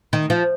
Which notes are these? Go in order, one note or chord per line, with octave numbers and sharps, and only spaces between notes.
D#3
F3